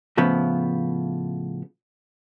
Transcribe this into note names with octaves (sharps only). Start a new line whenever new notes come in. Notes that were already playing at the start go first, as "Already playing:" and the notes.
A2 C#3 F3 B3